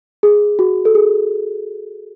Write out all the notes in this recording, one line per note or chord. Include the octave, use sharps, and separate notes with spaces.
G#4
F#4
A4
G#4